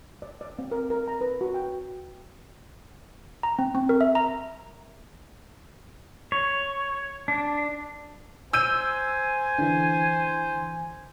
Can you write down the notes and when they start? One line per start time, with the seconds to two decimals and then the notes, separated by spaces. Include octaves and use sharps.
0.22 D5
0.41 D5
0.59 C4
0.72 A#4
0.90 A#4
1.08 A#5
1.21 B4
1.41 F#4
1.54 G5
3.43 A#5
3.59 C4
3.75 C4
3.89 A#4
4.01 E5
4.15 A#5
6.32 C#5
7.28 D4
8.53 C5 G#5 E6 G6 D#7
9.59 D3 E3